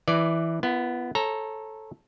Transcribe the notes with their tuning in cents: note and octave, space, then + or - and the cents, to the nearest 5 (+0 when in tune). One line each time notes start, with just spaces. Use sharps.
E3 +0 B4 +0 D5 +0
B3 +0 E4 +45 A#4 +0
A4 -5 C#5 -30 A#5 +0